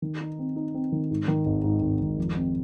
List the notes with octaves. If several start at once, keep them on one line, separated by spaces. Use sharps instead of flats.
D#3
D#4
C4
D#4
C4
D#3
G#2
D#3
G#1
G#2
G#1
G#1
F2
C4